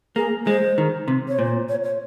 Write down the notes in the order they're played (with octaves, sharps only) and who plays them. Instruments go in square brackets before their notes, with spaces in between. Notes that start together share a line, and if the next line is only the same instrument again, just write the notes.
[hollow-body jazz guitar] A#3 [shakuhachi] G#4
[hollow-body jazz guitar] G#3 [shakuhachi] C5
[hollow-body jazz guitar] D#3
C3
[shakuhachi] C#5
[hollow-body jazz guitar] A#2 [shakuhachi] C5
[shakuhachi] C#5
C#5